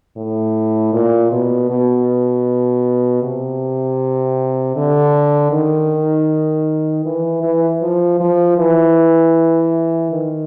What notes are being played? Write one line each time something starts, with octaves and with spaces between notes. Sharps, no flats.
A2
A#2
B2
B2
C3
D3
D#3
E3
E3
F3
F3
E3
D#3